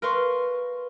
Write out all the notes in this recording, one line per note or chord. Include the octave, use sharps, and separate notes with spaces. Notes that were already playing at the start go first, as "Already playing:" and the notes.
A#4 B4 F5 C6 C#6